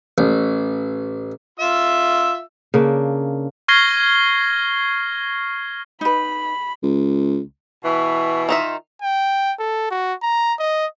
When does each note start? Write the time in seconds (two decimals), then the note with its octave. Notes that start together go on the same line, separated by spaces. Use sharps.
0.18 A1
1.60 F4 E5 E6
2.74 C#3 A#3 D4
3.68 C#6 F6 G#6 A#6 C7 G7
6.01 D#4 B4 B5
6.83 C#2
7.84 B2 E3 C#6
8.49 D#3 D#4 F4 E5
9.02 G5
9.60 A4
9.91 F#4
10.23 A#5
10.59 D#5